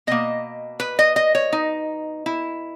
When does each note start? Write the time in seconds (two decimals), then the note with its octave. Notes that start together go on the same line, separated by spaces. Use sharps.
0.07 B2 A#3 D#5
0.80 B4
0.99 D#5
1.16 D#5
1.35 C#5
1.53 D#4
2.26 E4